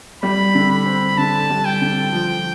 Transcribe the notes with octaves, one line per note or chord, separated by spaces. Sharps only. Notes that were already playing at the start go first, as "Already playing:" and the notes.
G3 B5
D3
B5
C4
D3 A5
G3
G5
D3
F3